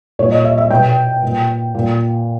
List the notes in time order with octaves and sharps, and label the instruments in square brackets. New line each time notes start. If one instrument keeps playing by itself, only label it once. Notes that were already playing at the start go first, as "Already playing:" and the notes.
[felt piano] A#2 C#5
D#5
E5
E5
B2 G5
A#2
A#2